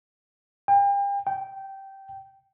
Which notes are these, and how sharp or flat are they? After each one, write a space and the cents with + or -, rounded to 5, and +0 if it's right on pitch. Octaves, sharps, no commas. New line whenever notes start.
G5 +40
G5 -10